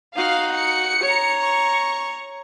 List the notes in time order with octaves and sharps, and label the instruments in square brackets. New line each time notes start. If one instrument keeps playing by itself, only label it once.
[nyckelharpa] D#4 F#4 [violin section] F5
[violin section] C#7
[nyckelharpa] C#5 A#5
[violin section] C#6